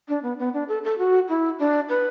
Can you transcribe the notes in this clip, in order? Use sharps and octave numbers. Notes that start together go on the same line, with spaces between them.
D4
B3
B3
D4
A4
A4
F#4
E4
D4
B4